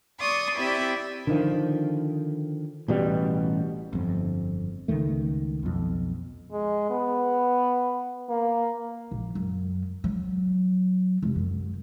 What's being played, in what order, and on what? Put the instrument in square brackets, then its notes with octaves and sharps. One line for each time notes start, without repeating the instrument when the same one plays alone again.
[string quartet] D5 C6 C#6 D#6
C4 E4 G4 D5 E5 G5
[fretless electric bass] D3 D#3 F3
A1 B2 G3
G1 F2
C#2 D#3 A3
B1 F2
[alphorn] G#3
B3
A#3
[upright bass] A#1
F#2
F#3
F1
F#2